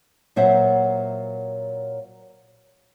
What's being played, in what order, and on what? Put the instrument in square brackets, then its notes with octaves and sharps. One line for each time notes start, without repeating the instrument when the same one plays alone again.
[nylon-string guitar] A#2 F#3 C5 E5 F#5